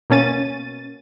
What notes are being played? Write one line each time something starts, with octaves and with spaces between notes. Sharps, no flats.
B2 A#3 C#4 A6 D#7